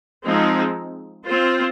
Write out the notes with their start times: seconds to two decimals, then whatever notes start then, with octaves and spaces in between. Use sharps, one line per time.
0.25 F3 G#3 C4 D#4
1.26 C4 F4 C5